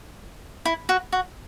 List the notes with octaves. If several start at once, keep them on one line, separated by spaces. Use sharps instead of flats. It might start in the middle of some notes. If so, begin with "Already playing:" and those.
E4
F#4
F#4